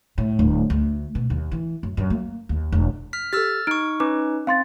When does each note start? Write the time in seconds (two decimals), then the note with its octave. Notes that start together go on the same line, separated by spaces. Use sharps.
0.18 A2
0.39 D1
0.70 D2
1.15 B2
1.30 D#2
1.52 E3
1.83 F#2
1.97 F#2
2.10 A#3
2.49 D#2
2.72 E1
3.13 F6 B6
3.33 G4 A4 E6 F6 A6
3.67 D#4 C#6 F6 D7
4.00 C#4 D#4 B4 D6
4.47 C4 F5 C6 A6